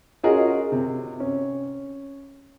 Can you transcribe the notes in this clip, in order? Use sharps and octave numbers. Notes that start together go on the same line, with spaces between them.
C#4 F4 F#4 G#4 A#4 D#5
C3
C#4